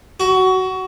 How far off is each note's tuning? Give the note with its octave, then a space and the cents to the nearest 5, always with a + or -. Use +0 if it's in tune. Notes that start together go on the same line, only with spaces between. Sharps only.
F#4 +20